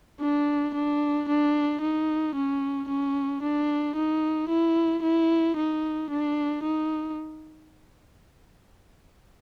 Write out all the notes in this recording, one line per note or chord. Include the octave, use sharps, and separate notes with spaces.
D4
D4
D4
D#4
C#4
C#4
D4
D#4
E4
E4
D#4
D4
D#4